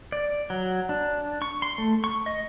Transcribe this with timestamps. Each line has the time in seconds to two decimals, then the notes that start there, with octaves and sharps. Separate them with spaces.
0.12 D5
0.50 F#3
0.89 D4
1.42 C#6
1.62 C6
1.78 A3
2.04 C#6
2.26 D#5